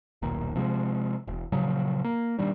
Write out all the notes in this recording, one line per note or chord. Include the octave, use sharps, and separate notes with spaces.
D#1 B1 A#2 D#3
C3 F3 G#3
E1
A#2 C#3 F3 F#3
A#3
A#2 D#3 G3 D4